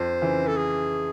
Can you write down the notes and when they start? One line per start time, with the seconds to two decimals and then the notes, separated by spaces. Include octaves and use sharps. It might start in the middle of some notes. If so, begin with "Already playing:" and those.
Already playing: F2 C5
0.22 C#3 E3
0.47 A4
0.57 G#4